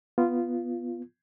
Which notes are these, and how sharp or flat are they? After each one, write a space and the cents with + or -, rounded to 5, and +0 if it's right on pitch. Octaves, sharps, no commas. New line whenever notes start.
B3 +0 F4 -15